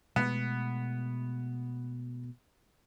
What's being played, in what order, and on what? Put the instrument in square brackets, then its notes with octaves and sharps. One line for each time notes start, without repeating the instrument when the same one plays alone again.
[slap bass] B2 G#3 A3 [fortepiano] B3